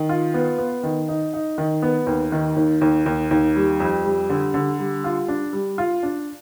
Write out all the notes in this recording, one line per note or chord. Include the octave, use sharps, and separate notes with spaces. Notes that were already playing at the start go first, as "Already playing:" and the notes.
Already playing: D#3
F4
B3
B3
D#3
D#4
D#4
D#3
B3
D#2
D#3
D#2
D#2
D#2
D#2
G3
F2
G3
D3
D3
G3
F4
D4
G3
F4
D4